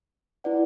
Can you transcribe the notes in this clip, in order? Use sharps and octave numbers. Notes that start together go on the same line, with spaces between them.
E4 B4 D5 F#5